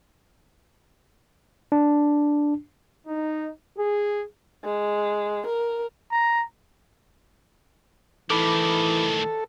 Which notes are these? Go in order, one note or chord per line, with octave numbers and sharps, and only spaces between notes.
D4
D#4
G#4
G#3
A#4
A#5
A2 D#3 E3 A4 B5 D6